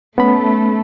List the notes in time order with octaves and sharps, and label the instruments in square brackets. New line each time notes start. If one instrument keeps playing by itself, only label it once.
[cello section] A3 [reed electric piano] B3 C#4 B5